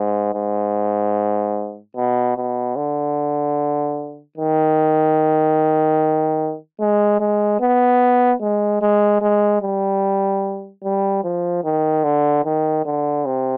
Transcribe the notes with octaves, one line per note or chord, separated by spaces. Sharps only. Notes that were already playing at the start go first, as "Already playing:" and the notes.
Already playing: G#2
G#2
B2
B2
D3
D#3
G#3
G#3
B3
G#3
G#3
G#3
G3
G3
F3
D#3
D3
D#3
D3
C3